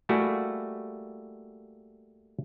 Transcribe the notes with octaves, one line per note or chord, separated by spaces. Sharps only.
G3 A3 A#3 E4 F#4 G#4